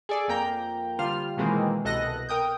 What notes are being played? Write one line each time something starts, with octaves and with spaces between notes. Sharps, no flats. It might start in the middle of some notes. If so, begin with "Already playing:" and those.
G#4 A4 D5
F2 A#3 G5 A#5 G6
D3 G3 F4 C5 F6
B2 D#3 E3 G#3 A#3 C4
C2 B2 A4 D#5 F#6 A#6
A#4 G5 D#6 G6